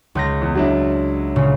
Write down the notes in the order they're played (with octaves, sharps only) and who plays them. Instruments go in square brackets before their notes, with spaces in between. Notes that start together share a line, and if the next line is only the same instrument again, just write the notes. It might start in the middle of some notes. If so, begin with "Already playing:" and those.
[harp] C#2 G6 A#6
[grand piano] E2
F#3 D4 E4
[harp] A#2 C#3